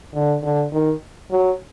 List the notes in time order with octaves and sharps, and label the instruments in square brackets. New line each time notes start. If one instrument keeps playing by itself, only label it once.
[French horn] D3
D3
D#3
F#3